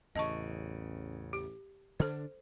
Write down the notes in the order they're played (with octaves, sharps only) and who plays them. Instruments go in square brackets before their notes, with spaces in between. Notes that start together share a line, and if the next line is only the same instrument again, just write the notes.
[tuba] A1 [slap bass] E2 C#3 [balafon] D#5 A5 C#6
[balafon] G4
[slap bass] D3 D4 [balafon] A4 C5